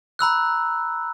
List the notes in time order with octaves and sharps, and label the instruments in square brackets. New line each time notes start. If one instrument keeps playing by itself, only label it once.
[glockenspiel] A#5 B5 E6 F#6